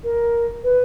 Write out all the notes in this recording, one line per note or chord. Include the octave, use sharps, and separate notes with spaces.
A#4
B4